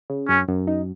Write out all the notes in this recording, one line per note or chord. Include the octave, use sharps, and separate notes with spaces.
C#3
F#2 C#4
F#2
D#4